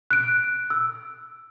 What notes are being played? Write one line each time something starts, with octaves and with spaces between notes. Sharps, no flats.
F#6 D7
E6